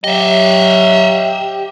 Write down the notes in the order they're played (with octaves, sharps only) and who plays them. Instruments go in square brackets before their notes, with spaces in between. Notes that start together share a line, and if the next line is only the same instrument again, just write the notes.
[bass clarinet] F#3 [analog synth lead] G4 [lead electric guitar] D#5 E5